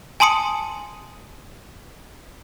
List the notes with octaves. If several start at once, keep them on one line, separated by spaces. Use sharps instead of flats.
G#5 A5 C6 D#6 C#7